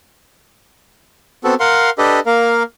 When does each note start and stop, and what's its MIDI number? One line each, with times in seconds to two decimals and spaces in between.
1.44 1.55 59
1.44 1.55 60
1.44 1.55 66
1.44 1.55 69
1.60 1.90 70
1.60 1.90 77
1.60 1.90 78
1.60 1.90 84
1.98 2.20 62
1.98 2.20 67
1.98 2.20 69
1.98 2.20 71
1.98 2.20 75
2.26 2.63 58
2.26 2.63 70
2.26 2.63 77